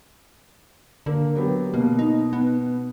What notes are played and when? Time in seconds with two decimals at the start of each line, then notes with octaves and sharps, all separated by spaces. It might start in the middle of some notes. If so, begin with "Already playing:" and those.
1.06 D3 A#3
1.35 F#3 B3 G4
1.74 B2 A#3
1.99 D#4
2.33 B3